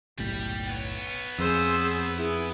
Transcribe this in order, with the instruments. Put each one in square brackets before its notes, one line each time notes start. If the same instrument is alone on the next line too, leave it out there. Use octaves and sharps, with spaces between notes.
[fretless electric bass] F#1 B1 A2 [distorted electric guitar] G3 G4
[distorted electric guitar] B3 C#5
[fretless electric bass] F2 [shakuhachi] G#4 [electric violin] C5 E6
[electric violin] E4 [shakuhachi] G#4